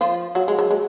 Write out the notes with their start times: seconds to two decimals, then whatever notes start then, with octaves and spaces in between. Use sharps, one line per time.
0.01 F3 F4
0.35 F#3 F#4
0.48 G#3
0.59 F#3
0.71 G#3